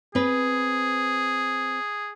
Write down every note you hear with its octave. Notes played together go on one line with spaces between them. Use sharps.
C4 G#4 B4